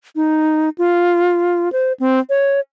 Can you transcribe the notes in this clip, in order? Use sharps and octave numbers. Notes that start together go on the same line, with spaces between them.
D#4
F4
C5
C4
C#5